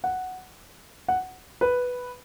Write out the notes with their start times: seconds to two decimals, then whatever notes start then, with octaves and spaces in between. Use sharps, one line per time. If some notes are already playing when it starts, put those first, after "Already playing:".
0.04 F#5
1.08 F#5
1.61 B4